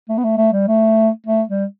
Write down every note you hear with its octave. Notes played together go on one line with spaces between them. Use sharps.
A3
B3
A3
A3
G3
A3
A3
G3